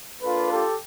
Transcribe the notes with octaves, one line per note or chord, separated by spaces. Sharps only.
A#3 D4 F4 A4 B4
G4 A4